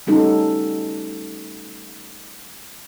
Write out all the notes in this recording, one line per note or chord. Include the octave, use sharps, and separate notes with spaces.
G3 A3 C#4 D#4 F#4 A4